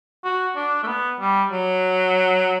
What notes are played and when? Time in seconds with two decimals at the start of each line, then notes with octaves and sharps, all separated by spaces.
0.24 F#4
0.56 D4
0.83 A3
0.87 B3
1.20 G3
1.52 F#3